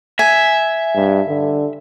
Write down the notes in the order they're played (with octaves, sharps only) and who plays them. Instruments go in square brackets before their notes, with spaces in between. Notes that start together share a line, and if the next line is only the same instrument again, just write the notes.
[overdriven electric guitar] E5 [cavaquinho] G#5
[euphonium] G2
D3